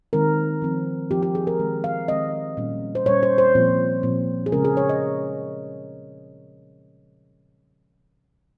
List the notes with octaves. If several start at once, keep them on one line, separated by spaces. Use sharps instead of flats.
D#3 G#3 C4 A#4
F3 C4
F3 C4 G4
G4
G#4
A#4
D#3 G#3 C4
F5
D#3 G#3 C4 D#5
A#2 G3 C#4
C5
A#2 G3 C#4 C#5
C5
C5
A#2 F3 C4
A#2 F3 C4
G#4
C#3 G#3 C#4 A#4
G#4
C#5
D#5